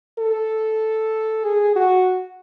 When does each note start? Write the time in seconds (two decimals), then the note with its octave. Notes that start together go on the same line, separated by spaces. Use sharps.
0.19 A4
1.45 G#4
1.76 F#4